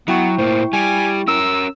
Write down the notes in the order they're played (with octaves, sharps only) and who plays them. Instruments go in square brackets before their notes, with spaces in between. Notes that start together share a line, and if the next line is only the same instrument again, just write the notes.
[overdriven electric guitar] F#3 [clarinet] B3 [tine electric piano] E4 G5 C#6
[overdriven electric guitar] A2 A#3 [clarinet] C5
[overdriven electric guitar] G3 G4 [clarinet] G#5
[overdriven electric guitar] C#4 A#4 [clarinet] E6